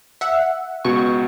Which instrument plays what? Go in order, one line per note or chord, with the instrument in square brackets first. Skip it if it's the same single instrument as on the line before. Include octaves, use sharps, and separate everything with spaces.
[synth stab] E5 F#5
[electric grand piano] C#2 B2 F#4 [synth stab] C#6